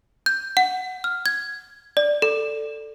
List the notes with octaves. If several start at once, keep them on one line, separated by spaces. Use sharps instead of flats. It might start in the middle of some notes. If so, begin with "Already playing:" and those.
G6
F#5
F6
G#6
D5
A4